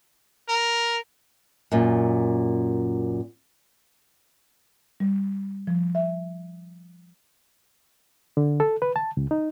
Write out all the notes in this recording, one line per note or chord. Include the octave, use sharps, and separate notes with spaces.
A#4
F#2 A#2
G3
F3
E5
D3
A4
B4
A5
C#2
D#4